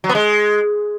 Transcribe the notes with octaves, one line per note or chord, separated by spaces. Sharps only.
F#3
B3
G#3